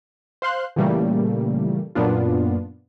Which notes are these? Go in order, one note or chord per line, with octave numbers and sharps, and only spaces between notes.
C5 F5 C6 F#6
A#2 C#3 E3 G3 A3 A#3
F#2 A#2 A#3 B3 D4 F4